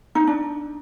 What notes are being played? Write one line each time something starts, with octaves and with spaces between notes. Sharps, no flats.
D#4
D4